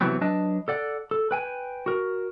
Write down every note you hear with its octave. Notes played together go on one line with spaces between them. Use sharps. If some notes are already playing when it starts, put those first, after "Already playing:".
C3 E3 F#3 B3 C4
F#3 D4 B4 D#5 A5
A4 D5 F#5
A4
B4 G5 G#5
F#4 A#4